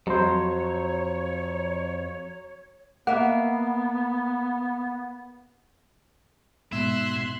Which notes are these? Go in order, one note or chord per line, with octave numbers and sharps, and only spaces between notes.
F2 F#3 C5 C#5
A#3 B3 E5 F#5
G#2 B2 B3 E5 C6 F#6 G#6